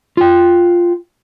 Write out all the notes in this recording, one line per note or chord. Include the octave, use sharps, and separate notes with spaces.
F4 G5